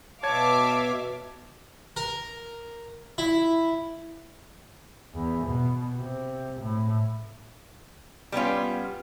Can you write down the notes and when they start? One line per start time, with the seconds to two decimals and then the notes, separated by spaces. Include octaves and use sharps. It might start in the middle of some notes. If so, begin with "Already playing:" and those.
0.23 B2 C#5 E5 F5 A5 D6 G#6
1.97 A#4
3.18 E4
5.14 E2
5.45 B2
5.95 C3
6.60 A2
8.32 G3 B3 C#4 F4